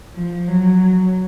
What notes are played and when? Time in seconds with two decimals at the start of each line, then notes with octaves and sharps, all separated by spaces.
0.15 F3
0.48 F#3